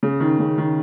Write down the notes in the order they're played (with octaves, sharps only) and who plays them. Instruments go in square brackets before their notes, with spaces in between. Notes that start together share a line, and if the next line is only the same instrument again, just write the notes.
[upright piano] C#3
D#3
C#3
D#3